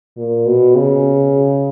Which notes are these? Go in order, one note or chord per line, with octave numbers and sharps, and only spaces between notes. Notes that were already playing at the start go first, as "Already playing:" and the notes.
A#2
B2
C#3